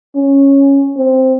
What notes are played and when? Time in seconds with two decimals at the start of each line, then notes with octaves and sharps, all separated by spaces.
0.15 C#4
0.97 C4